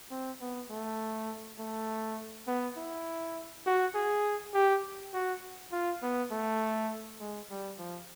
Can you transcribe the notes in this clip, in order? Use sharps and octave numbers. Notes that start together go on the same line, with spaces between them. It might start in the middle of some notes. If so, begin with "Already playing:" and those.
C4
B3
A3
A3
B3
E4
F#4
G#4
G4
F#4
F4
B3
A3
G#3
G3
F3